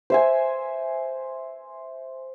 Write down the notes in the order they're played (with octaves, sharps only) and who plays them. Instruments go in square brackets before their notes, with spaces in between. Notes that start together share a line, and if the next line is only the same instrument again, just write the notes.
[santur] C5 E5 G#5